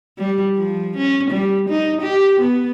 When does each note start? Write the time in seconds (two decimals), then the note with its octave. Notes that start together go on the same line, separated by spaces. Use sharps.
0.18 G3
0.56 F3
0.97 C#4
1.31 G3
1.70 D#4
2.02 G4
2.41 B3